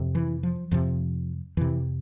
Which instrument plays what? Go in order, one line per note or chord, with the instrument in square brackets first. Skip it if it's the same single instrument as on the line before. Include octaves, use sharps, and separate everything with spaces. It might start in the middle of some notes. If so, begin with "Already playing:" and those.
Already playing: [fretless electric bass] F2 C3
E3
F3
F2 C3 F3
F2 C3 E3